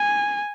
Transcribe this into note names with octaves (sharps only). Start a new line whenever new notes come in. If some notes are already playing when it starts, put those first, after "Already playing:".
Already playing: G#5